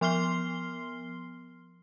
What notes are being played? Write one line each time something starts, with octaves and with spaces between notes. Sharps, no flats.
F3 B3 C6 F6 C7 G7